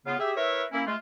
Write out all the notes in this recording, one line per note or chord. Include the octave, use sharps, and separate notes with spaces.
C#3 B3 F4
G4 G#4 E5
E4 A#4 B4 C#5 E5
A#3 C#4 E4
G#3 A3 F4